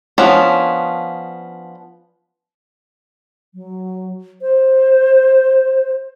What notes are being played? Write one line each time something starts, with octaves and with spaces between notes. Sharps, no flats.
F3 B3 C#4 D4
F#3
C5